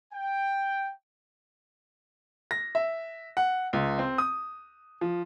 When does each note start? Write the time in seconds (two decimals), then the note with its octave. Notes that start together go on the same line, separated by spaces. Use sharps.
0.13 G5
2.51 A#6
2.75 E5
3.37 F#5
3.73 C#2
3.99 C4
4.18 D#6
5.01 F3